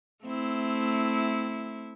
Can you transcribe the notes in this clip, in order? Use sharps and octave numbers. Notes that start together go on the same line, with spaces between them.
A3 C4 E4